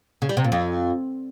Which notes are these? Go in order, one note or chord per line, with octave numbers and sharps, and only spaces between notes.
C#3
G3
C3
A#2
F2